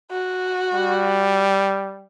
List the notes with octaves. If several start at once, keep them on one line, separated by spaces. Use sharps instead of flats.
F#4
G3